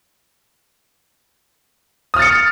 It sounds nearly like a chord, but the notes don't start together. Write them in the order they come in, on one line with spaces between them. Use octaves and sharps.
D#6 F6 A6 C#7